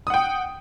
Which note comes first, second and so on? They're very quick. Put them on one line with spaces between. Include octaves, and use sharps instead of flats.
D#6 F#5 G5